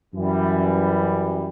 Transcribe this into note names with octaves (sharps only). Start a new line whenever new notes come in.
F#2 E3 G3